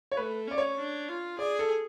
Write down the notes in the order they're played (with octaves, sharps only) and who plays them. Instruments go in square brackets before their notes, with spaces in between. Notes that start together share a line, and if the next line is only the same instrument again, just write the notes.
[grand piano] C#5
[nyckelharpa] A3 [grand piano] B4
[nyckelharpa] C#4 [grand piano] D5
[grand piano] C#5
[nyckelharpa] D4
F4
[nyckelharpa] G#4 [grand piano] D5
[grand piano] A4